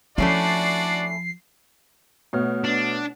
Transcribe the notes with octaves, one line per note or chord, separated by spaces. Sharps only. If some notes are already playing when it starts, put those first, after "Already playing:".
F3 A3 C#4 D4 E4 F#4 D5 C7
B2 A3 C#5 F6
D4